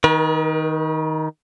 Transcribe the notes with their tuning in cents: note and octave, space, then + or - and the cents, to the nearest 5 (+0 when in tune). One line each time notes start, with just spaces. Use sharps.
D#3 +10 B4 -45